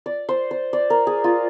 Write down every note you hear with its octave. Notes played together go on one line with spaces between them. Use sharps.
D5
C5
C5
D5
A#4
G#4
F4